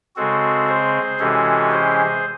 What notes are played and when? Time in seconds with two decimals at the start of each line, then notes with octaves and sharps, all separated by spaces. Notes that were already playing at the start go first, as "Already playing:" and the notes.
0.16 C#3 G#3 C4 F#4 A4
0.68 G#4 C5
1.19 C3 E3 G#3 C#4 F#4 A4
1.71 G#4 C5